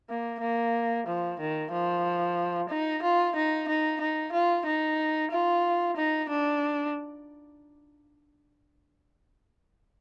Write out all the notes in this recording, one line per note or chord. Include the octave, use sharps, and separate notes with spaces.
A#3
A#3
F3
D#3
F3
D#4
F4
D#4
D#4
D#4
F4
D#4
F4
D#4
D4